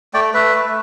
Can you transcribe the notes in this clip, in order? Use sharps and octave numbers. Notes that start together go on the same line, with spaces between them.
A3 D5 G5
A3 B4 E5
A3